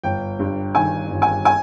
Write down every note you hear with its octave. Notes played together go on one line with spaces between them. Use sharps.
G1 G5
G2
D#3 G#5
G1
G#5
G#5